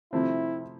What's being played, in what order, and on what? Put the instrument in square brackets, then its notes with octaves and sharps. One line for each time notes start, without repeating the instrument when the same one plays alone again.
[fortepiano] C3 F3 A3 C4 [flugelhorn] E4